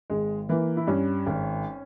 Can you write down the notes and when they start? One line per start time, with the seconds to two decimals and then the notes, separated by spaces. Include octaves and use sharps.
0.10 G#1 G#3
0.49 E3 A#3
0.77 E4
0.87 G2 C#4
1.27 G#1